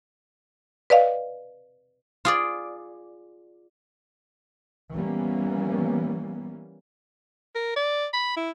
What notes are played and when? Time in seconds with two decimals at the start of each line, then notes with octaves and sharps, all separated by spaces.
0.90 B4 D5 D#5 F5
2.25 F4 G#4 D5
4.93 E3 G3 A#3 B3 C#4
7.55 A#4
7.76 D5
8.13 B5
8.37 E4